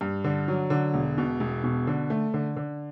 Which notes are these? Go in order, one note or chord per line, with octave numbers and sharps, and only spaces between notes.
G2
D3
F#3
D3
E1
B2
E1
B2
D3
A3
D3
D3